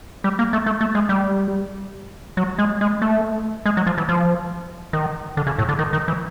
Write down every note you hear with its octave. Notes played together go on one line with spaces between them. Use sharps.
G3
A#3
A3
A3
A3
G#3
G3
F#3
G#3
G#3
A3
G#3
F#3
F3
E3
F3
D#3
D3
C#3
A2
D3
D#3
D#3
E3